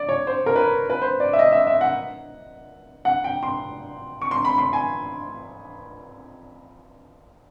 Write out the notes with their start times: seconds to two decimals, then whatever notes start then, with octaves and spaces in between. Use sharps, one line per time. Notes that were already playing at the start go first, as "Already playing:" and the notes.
Already playing: D5
0.09 C#5
0.27 C5
0.46 A#4
0.56 B4
0.90 B4
1.02 C5
1.20 D5
1.33 E5
1.39 D#5
1.52 E5
1.67 E5
1.81 F#5
3.05 F#5
3.24 G5
3.43 C6
4.22 C#6
4.31 C6
4.45 B5
4.58 C6
4.73 G#5